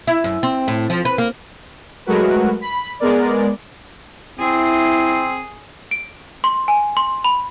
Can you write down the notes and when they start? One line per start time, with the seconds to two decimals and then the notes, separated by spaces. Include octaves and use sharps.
0.07 E4
0.24 F#2
0.43 C4
0.68 A2
0.90 F3
1.05 B4
1.18 A#3
2.06 F#3 G#3 A3 F#4 A#4 B4
2.61 B5
3.00 G#3 B3 A#4 D5
4.39 C4 E4 G#4
5.91 D7
6.44 C6
6.68 G#5
6.97 C6
7.25 B5